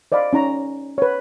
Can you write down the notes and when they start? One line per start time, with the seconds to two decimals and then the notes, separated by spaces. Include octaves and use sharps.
0.12 C5 D5 D#5 F5 B5
0.33 C#4 D#4 A#5 C#6
0.98 B4 C#5